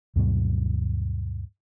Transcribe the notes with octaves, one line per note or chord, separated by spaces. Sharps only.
D2 G2 B2 F#3